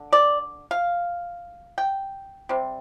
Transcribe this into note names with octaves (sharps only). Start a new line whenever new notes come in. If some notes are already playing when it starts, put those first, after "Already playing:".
Already playing: D3
D5
F5
G5
C3 G3 C4